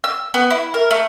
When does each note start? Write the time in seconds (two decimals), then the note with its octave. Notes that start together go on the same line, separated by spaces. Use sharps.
0.04 E6
0.34 B3
0.51 E4
0.74 A#4
0.91 A3